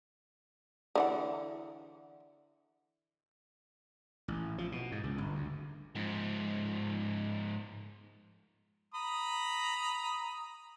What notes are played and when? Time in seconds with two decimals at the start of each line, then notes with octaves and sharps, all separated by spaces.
0.95 D3 E3 F#5
4.28 A1
4.58 F3
4.72 B2
4.92 G#2
5.03 C#2
5.18 G1
5.35 D2
5.95 G#2 F3
8.94 A#5 B5 D#6